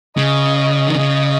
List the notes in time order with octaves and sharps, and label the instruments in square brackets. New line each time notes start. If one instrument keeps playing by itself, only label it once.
[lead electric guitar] C#3 [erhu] D#5
[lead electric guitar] D#3
[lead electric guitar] C#3 [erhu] D#5